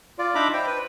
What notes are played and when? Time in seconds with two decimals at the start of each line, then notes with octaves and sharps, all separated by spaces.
0.19 F4 D5
0.35 D4 D#4 E5 A#5 B5 D6
0.54 C5 G5
0.67 B4